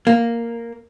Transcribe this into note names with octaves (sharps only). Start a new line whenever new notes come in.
A#3